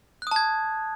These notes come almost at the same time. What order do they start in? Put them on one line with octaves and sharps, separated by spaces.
F#6 D#6 A5 G#6